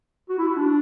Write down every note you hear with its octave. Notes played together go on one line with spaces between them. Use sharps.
F#4
E4
F#4
D4